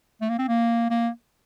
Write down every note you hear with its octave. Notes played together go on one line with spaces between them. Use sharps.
A3
A#3
C4
A#3
A#3